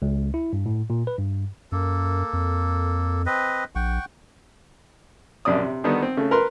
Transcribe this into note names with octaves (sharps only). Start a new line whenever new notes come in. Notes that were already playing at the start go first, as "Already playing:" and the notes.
C#2
E4
G2
A2
A#2
B4
G2
F#2 A#3 A4
F2
C4 B4 D#5
A#1 F#5 G5 C#6
A#1 F#2 C3 D5 D#6
C3
D3 D#3 G3 B3 D#4
C4
C#3 A3
A#4 B4 C6